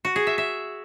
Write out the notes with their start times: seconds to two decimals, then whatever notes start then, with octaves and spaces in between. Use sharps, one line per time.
0.05 F#4
0.16 G#4
0.27 E5
0.38 E5